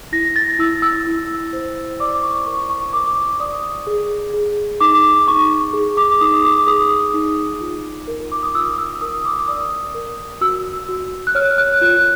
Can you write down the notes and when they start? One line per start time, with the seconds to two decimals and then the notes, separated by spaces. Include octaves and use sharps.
0.12 E4 A#6
0.36 A6
0.59 E4 E6
0.82 E6
1.07 E4
1.53 C5
2.00 D5 D6
2.23 C#6
2.46 A#4 C#6
2.70 C#6
2.93 A#4 D6
3.40 D5 D#6
3.87 G#4
4.33 G#4
4.81 D#4 D6
5.27 D#4 C#6
5.73 G#4
5.97 D6
6.21 D#4 D#6
6.44 D6
6.67 G#4 D#6
7.14 D#4
7.61 F4
8.07 A#4
8.32 D6
8.43 D#6
8.55 F4 E6
8.78 E6
9.01 A#4 D#6
9.25 D6
9.48 D5 D#6
9.94 A#4
10.41 F#4 E6
10.89 F#4
11.27 F#6
11.35 C#5 F6
11.58 F#6
11.81 F4 F#6